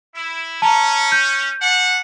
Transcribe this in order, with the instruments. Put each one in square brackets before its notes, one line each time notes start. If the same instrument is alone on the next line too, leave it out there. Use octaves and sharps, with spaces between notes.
[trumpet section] E4
[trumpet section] C#4 [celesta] A5 A#5
[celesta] G6
[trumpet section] D4 F#5